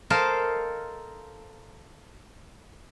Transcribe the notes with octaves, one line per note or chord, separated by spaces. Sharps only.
A4 A#4 C5 D#5 F5